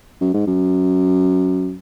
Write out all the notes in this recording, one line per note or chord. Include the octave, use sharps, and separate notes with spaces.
F#2
G#2
F#2